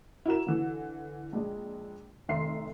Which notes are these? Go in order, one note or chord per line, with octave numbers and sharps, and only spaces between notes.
E4 F#4 A#4 E7
D3 E3
A#1 G#3 D4
F1 D#3 E5 C6 C7